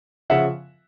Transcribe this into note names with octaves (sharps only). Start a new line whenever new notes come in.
C#3 F3 E5 F#5